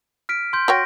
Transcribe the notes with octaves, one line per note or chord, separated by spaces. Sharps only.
F6 B6 D7
C6 G6
F#4 C#5 G5 C#6 A#6 D7